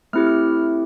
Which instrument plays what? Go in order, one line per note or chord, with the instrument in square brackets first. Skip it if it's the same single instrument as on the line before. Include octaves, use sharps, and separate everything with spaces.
[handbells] A3 C4 E4 G4 F6
F6